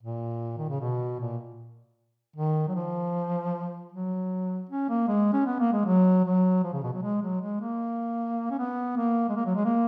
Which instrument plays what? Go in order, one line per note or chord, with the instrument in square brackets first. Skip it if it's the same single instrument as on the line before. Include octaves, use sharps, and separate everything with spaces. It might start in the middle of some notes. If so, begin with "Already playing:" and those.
[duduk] A#2
D#3
C#3
B2
A#2
D#3
F#3
F3
F#3
C#4
A#3
G#3
C#4
B3
A#3
G#3
F#3
F#3
F3
C#3
B2
F#3
G#3
F#3
G#3
A#3
C#4
B3
A#3
G#3
A#3
F#3
G#3
A#3